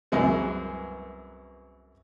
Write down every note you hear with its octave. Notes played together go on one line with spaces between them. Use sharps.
C2 F#2 E3 G#3 A#3 B3